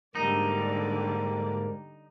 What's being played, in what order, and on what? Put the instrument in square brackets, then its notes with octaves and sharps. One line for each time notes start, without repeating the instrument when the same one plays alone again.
[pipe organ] G#2 A#3 [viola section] D3 G3 D5 [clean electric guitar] D#4